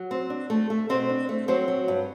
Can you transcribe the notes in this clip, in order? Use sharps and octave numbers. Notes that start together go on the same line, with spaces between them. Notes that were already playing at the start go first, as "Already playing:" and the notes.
Already playing: F#3
C4
D4
A3
A3
B2 C4 C5
D4
A3
F#3 C4 C5
F#3
G2